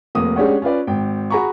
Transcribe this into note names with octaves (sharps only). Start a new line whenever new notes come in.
F1 A#3 D#6
G#3 C#4 D4 G4 C#5 F#5
C#4 F4 B4 D5
G#1 G5
F#4 G#4 A#5 B5 C#6